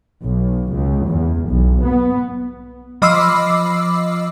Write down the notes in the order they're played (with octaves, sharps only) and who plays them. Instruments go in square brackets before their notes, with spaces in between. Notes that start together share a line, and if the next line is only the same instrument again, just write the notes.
[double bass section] B1
C#2
E2
B1
B3
[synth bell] F3 D#5 B5 D6 E6 C7